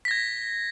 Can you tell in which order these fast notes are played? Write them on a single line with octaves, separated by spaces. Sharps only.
B6 A#6 G#6